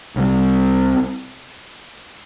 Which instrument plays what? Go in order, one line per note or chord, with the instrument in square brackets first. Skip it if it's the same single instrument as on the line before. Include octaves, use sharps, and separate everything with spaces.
[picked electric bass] C2 C3 G3